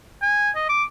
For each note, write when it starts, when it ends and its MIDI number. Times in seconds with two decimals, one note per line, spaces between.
0.22 0.50 80
0.56 0.64 75
0.69 0.84 86